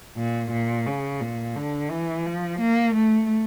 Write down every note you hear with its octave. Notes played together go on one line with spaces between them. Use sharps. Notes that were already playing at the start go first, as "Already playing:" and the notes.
A#2
A#2
C#3
A#2
D3
E3
F3
A#3
A3